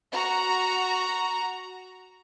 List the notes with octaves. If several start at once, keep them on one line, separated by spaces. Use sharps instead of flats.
F#4 A#5